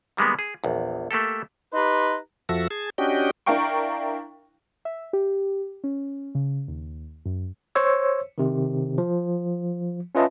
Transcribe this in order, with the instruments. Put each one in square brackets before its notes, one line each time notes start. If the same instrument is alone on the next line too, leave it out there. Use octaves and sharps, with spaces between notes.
[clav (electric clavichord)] D#3 G3 G#3 A#3 B3
G#4
A#1 E2
A3 A#3 G4 A4
[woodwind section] D#4 G4 B4 A#5 C6
[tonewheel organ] F2 F3 F#4 A4 E5 A#6
G#4 A5 G#6
C#4 D4 F#4 G4 D#5 G5
[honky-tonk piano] D4 E4 A#4 F5 G5 C#6
[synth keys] E5
G4
C#4
C#3
D#2
F#2
[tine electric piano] C5 C#5 E6
C3 D#3
F3
C#4 F4 B4 D#5 E5 A5